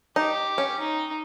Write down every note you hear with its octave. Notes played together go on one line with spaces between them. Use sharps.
D#4 G4
C#4
D#4